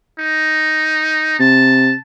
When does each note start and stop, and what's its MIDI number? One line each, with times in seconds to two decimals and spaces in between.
0.19 1.36 63
1.39 1.93 48
1.39 1.97 81